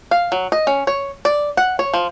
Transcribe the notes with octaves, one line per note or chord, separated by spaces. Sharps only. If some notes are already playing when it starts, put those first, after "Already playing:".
F5
F#3
D#5
C#4
C#5
D5
F#5
C#5
F3